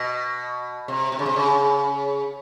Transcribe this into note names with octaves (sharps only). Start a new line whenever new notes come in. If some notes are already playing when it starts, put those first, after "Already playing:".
Already playing: B2
C3
C3
C#3
C3
C#3